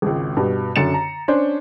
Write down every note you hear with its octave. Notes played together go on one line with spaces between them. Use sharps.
G#1 C#2
G2 B2
F#2 D3 A6 C#7 E7
A#5
C#4 D4 C5